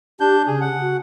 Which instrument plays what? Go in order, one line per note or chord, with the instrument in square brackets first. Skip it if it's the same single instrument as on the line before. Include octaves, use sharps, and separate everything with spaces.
[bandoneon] D4 G6 [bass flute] G4
[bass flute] C#3 [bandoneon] G#4
[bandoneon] F#5
[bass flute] F#4